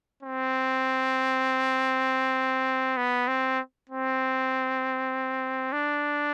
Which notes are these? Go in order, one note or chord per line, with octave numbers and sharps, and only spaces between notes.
C4
B3
C4
C4
D4